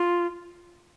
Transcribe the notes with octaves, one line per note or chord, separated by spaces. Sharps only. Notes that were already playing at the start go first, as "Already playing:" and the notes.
Already playing: F4